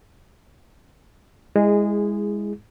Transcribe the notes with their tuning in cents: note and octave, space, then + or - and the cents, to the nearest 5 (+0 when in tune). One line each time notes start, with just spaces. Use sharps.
G#3 -20 E4 +0 G#4 +0